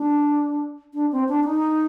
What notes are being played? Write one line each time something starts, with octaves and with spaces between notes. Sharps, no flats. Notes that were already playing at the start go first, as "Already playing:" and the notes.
Already playing: D4
D4
C4
D4
D#4